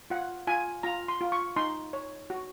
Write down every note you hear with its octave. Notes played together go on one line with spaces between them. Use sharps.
F4 F#5
F4 G#5
F4 A#5
C6
F4
C#6
D#4 C6
C#5
F#4